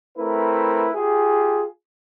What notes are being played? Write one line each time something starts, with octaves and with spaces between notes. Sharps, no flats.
A3 C4 E4 A#4 B4
F4 G4 G#4